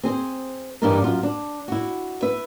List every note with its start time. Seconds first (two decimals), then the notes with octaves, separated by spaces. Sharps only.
0.03 C4 G#4 C5
0.82 G2 E3 G3 D4 D#4 A#4
1.02 F#2 F4
1.23 D4
1.68 E4 F#4
2.22 B4 E5